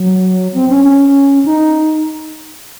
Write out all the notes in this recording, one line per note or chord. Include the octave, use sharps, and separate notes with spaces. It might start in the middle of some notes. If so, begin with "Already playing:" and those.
Already playing: F#3
C4
C#4
C#4
D#4